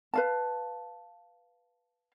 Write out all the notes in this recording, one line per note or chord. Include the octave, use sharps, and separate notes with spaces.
B4 F5 A5